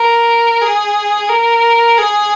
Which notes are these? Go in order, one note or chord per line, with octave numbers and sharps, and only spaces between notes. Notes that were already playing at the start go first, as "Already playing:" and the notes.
Already playing: A#4
G#4
A#4
G#4